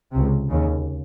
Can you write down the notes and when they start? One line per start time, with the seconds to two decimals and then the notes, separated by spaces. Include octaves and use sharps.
0.13 C#2 C3
0.49 D#2 C#3